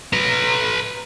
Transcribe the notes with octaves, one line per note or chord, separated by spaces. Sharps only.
B4 A#5